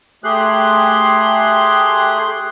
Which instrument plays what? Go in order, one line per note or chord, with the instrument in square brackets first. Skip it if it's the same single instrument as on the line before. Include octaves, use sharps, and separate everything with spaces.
[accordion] A3 G4 G#4 C6 F#6